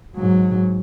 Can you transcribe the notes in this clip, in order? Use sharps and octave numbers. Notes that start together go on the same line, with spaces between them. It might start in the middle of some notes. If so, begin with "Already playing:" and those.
G#2 F#3